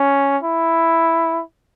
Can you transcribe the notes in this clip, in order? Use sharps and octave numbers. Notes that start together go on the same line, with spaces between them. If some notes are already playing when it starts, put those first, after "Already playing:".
Already playing: C#4
E4